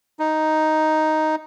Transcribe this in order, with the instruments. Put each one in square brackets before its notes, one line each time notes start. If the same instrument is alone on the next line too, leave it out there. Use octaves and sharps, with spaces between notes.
[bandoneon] D#4